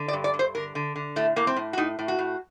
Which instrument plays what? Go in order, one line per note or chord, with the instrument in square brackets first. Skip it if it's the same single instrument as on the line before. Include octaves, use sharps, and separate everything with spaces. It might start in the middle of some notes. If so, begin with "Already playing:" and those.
Already playing: [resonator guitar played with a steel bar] D3
D5
G2
D5
G2
C5
D3 A#4
D3
D3
A2 A3
A2 A#3
C4
A2
F#4
A2 D#4
A2
F#4
A2